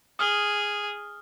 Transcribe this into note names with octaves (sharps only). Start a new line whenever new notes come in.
G#4 D#6 F6 G7